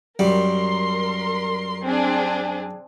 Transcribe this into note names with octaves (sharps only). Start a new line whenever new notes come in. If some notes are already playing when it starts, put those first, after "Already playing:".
F#2 G3 A#4 C6
C4 D4 G#4